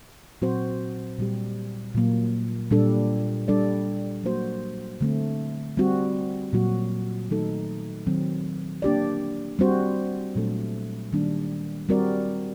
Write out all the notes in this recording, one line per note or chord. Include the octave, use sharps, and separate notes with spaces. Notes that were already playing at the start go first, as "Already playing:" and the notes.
A#2 F#3 C4 F#4 C5
A#2 G3 C4 G4
A#2 F#3 A#3
A#2 G3 D4 A4
G3 D4 A4 D5
F#3 A#3 F#4 C5
D3 A3 C4
G3 C4 F#4
A#2 F#3 A#3 F#4
D#3 F#3 A3 D#4 A4
D#3 F#3 C4
A#3 D4 G4 D5
G3 C4 F#4 C5
A#2 F#3 A3 D4 A4
D#3 G3 A#3 D4
G3 C4 F#4 A#4 D5